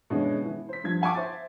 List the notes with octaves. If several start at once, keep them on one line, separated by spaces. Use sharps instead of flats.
B2 D3 E3 G#3 C#4 D4
E3
C5 B6
G2 F3 G#6
F5 F#5 G#5 A5 C#6 D6
C5 E5 A6